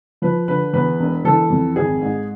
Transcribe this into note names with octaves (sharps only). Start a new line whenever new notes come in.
F3 B4
D3 B4
E2 B4
E1
E3 A4
F2
G#1 G#4
G#2